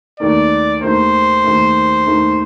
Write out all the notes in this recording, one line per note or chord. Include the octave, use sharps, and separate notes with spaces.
D#2 D#3 A3 D#4 A#4 D5
D#2 D#3 A3 D#4 A#4 C5
D#2 D#3 A3 D#4 A#4
D#2 D#3 A3 D#4 A#4